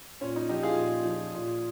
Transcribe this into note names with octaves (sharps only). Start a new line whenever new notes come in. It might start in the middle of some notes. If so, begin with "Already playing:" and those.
A#2 C#4
D#4
F3 D#4 G4
F4 G#4
A#2
F3
A#2